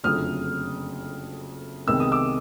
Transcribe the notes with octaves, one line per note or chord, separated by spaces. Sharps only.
F#1 F2 D3 F#3 A3 D#6 F6
C2 C3 D#3 G#3 B3 E6
D#6
D6 E6